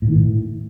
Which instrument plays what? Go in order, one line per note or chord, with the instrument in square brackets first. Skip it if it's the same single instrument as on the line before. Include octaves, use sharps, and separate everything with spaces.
[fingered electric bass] A2
D#3
A2